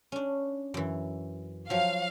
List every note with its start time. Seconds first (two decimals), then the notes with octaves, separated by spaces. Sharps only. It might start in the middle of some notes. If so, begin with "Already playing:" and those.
0.12 C#4 D4
0.74 F#2 E3
1.70 F3 F#3 F5